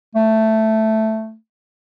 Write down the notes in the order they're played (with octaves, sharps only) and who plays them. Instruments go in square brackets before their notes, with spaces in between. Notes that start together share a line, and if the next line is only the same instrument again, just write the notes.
[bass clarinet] A3